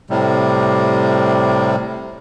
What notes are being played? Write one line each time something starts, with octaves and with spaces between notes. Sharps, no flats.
A2 C3 G3